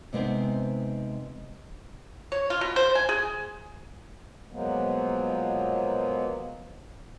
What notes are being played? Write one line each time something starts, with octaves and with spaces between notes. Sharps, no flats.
C3 G#3 B3 C4 D#4
C#5
F4
B2
C5
G#5
G#4
B2 F3 F#3 G#3 A#3 B3